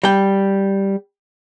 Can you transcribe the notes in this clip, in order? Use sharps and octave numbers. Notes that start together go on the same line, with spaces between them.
G3 G5